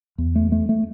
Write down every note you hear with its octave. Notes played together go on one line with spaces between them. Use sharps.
E2
A3
A3
A3